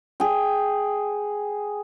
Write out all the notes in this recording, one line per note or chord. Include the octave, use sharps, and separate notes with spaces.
G#4 G5